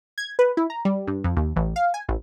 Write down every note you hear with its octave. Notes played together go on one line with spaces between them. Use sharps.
G#6
B4
E4
A#5
G3
G2
F2
D#2
A1
F5
G#5
A1